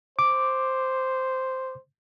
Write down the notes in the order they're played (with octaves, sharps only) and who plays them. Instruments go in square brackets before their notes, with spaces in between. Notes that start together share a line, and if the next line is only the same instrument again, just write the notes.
[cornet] C5 [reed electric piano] D6